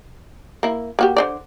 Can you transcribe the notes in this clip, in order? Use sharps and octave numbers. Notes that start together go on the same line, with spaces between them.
A#3 E4
A#3 F#4 G4
D3 C5 D5